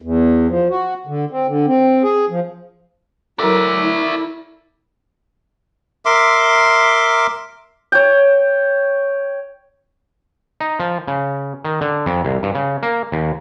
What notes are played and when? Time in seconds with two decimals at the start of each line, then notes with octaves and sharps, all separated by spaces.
0.02 E2
0.48 F3
0.70 F#4
1.07 D3
1.31 C4
1.47 D3
1.67 C4
2.03 G#4
2.30 F3
3.39 F#3 E4 A4 A#4 D5 E5
3.81 E4
6.05 A#4 E5 C6 D6
7.92 C#5 G5
10.61 D#4
10.80 F3
11.08 C#3
11.65 D#3
11.81 D3
12.06 F2
12.25 C2
12.43 G2
12.55 C#3
12.83 A#3
13.12 D#2